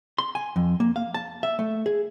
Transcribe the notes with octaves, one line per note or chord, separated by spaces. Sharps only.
C6
G#5
F2
A#3
F5
A5
E5
A3
G#4